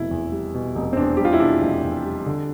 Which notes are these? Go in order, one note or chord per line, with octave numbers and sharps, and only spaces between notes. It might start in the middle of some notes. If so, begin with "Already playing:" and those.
Already playing: F1 B2 E4
E2
G3
B2
F1
C4
E2 D4
G3 G4
F4
E4
B2 D4
F1
E2
G3
D3